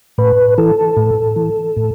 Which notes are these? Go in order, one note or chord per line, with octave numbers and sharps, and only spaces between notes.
A2 B4
E3 A4
A2
E3
A2